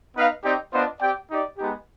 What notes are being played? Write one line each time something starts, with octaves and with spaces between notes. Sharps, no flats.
B3 D#4 B4 F5
C4 D#4 G4 D5 G5
B3 D4 F4 C5 D#5
C4 G4 D5 G5
D#4 G4 D5
G#3 B3 D#4 G4